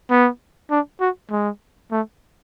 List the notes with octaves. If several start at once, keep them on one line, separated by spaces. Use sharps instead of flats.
B3
D4
F#4
G#3
A3